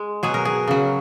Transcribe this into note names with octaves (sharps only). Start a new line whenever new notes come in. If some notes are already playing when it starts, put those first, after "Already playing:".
Already playing: G#3
B2 F#3 G#4
A#4
G#4
C#3 F#3